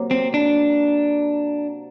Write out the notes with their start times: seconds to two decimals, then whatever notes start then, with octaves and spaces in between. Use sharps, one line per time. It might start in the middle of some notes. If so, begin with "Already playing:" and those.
Already playing: C3 F#3 A#3
0.11 C4
0.34 D4